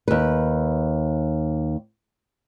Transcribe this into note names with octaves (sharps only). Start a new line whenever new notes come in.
D#2 B4